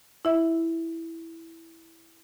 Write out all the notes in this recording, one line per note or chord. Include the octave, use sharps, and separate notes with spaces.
E4 E5